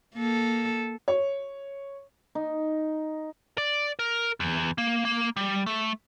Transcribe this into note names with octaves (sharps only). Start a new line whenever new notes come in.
A#3 A4
C#5
D#4
D5
A#4
E2
A#3
A#3
G3
A3